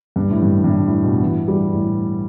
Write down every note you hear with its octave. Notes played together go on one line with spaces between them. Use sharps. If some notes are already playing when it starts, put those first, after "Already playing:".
G2
A2
G2
G2
A2
A2
B2
E3
G3
A2